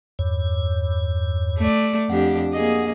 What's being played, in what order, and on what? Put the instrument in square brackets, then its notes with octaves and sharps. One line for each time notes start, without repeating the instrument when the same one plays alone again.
[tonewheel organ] E2 G2 C#5
[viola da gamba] A3 D5
[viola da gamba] F2 D4 G4 [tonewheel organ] F#5
[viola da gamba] A#3 G#4 D#5